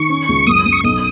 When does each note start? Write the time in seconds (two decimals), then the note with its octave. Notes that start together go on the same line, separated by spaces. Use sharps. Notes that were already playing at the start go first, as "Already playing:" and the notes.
Already playing: D#3 C#6
0.09 C#4
0.29 C#2
0.47 F#2 D#6
0.66 F#2
0.72 C#6
0.84 B1 D#6